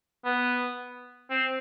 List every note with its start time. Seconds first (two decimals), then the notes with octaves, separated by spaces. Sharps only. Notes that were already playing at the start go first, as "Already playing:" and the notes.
0.25 B3
1.30 C4